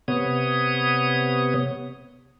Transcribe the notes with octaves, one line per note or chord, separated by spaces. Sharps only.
C3 B3 C#5 D#6